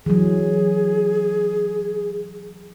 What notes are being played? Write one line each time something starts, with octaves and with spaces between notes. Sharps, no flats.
E3 F#3 G#4